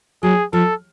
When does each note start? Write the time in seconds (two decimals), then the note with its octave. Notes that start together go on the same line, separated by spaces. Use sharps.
0.23 F#3 G#4
0.53 F3 A4